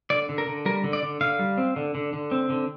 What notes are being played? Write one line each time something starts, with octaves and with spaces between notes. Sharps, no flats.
D3 D5
D3
A#4
D3
G3 A#4
D3
D5
D3
D3 F5
G3
C4
D3
D3
D3
C4
D3